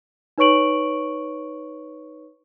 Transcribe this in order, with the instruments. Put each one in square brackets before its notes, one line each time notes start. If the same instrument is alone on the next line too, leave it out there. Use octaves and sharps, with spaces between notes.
[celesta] D#4 B4 C#5 C#6 D7 F#7